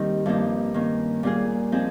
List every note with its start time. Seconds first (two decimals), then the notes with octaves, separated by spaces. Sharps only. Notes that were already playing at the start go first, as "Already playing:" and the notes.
Already playing: D#3 G3 A#3 C4 D#4
0.26 G2 F3 A#3 D#4
0.74 D#3 A#3 C#4
1.23 A#2 G3 A#3 F4 G#4
1.72 F3 C4 D#4 G#4